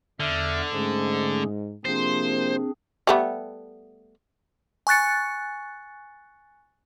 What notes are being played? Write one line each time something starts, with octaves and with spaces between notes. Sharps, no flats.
E2 D3 E5 F6
G#2 A3 C#4 G#4
C3 F3 A#3 C4 D4 G#4 C5
G3 A3 B3
G#5 C#6 F#6 A6 C#7